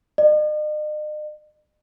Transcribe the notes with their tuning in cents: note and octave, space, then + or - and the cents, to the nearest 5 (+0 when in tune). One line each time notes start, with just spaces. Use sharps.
D#5 -45